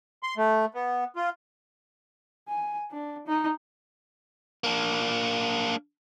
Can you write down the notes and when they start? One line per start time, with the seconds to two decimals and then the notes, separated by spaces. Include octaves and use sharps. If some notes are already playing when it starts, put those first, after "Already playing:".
0.23 C6
0.37 A3
0.74 B3
1.16 F4
2.48 G#5
2.91 D4
3.27 D#4
4.64 A#3 D4